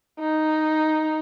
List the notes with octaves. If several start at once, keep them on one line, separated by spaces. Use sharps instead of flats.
D#4